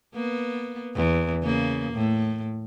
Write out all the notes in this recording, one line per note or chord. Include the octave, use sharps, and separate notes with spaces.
A#3 B3
E2
C#3 A#3
A2